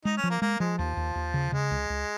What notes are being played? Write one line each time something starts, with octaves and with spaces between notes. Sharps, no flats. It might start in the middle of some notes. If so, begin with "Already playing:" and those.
G#3 D#4
C#4
F3
A#3
G#3 A#3
F3 G#3
D#2 F3
D#2
D#2
C#3
C#3 G#3
C#2
C#2